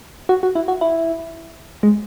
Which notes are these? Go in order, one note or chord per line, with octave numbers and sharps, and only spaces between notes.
F#4
F#4
E4
F#4
E4
G#3